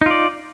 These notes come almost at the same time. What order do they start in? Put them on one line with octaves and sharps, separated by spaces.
D#4 F4 D5